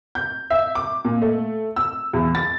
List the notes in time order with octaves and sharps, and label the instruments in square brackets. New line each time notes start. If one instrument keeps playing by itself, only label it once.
[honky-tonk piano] G6
E5
D6
A#2
A3
E6
E2
A6